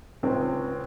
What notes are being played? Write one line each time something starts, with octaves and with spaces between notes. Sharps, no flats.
C#2 C4